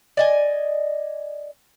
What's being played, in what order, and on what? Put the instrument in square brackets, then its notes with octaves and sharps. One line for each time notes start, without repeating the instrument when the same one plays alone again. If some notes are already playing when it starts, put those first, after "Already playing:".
[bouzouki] D5 D#5 G#5